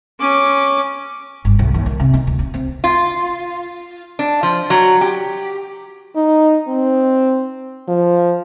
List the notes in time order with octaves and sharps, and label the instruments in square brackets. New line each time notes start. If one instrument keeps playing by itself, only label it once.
[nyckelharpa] C#4 D6
[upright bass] G1
B1
D#2
D#3
C3
D#4
D2
D#4
C4
[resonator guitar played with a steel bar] F4
D4
F3
F#3
G4
[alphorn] D#4
C4
F3